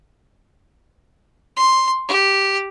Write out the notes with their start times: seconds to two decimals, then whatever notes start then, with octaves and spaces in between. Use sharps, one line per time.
1.57 C6
2.09 G4